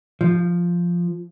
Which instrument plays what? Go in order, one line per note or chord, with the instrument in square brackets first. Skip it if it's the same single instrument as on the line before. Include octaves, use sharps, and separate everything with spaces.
[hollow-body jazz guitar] F3